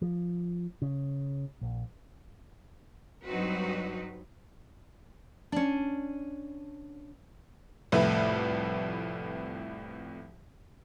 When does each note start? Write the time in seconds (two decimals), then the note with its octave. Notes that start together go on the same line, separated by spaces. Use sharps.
0.02 F3
0.82 C#3
1.61 A#1
3.26 G2 F#3 C4 D#4 F#4 B4
5.52 C#4 D4
7.92 C2 F2 A2 B4 E5